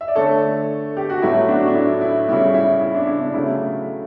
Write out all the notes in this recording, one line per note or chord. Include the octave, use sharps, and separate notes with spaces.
E5
D5
D3 A3 A4 C#5
G4
F#4
A2 F#3 A3 E4
D4 F#4
D4
E4
E4
C#3 G3 E4
E4
E4
D4
E4
D4
C#3 F#3 A3 E4